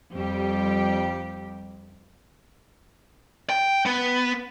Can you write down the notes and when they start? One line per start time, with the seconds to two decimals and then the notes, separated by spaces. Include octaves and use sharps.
0.13 F2 G3 G4
3.50 G5
3.86 B3